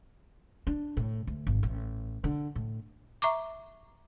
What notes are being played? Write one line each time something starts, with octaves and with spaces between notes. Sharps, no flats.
D4
A2
D2
G#1
A1
D3
A2
E5 A#5 C#6 D6